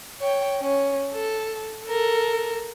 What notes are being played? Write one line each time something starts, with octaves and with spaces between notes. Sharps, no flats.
C#5 G5
C#4
A4
A4 A#4